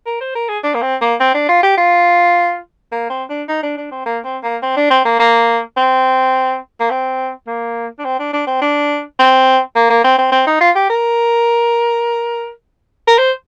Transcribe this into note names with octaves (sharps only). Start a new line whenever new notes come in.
A#4
C5
A#4
G#4
D4
A#3
C4
A#3
C4
D4
F4
G4
F4
A#3
C4
D4
D#4
D4
D4
C4
A#3
C4
A#3
C4
D4
C4
A#3
A#3
C4
A#3
C4
A#3
D4
C4
D4
D4
C4
D4
C4
A#3
A#3
C4
C4
C4
D#4
F4
G4
A#4
A#4
C5